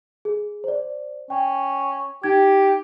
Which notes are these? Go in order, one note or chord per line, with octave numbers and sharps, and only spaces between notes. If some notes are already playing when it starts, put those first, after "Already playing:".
G#4
C5 D5
C#4 G5
D#4 G4 G#6